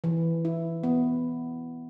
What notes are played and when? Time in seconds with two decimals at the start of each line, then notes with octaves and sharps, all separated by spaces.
0.04 E3
0.45 E4
0.83 B3